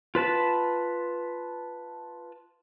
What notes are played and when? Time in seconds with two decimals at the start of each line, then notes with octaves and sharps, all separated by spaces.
0.15 F4 B4 A5 B5